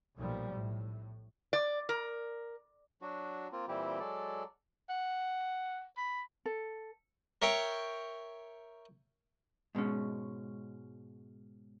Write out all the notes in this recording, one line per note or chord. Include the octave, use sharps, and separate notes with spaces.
B1 A#2 F3 G3
A2
D5
A#4
F#3 D4 F#4
A#3 C4 F4
A#2 E3 G3 C4 E4 G4
F#3 G#3 A4 D5
F#5
B5
A4
A#4 C#5 E5 G5
G#2 B2 G#3 C#4